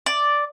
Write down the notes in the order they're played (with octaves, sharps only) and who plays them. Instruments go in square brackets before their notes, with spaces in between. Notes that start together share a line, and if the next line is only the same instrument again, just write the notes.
[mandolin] D5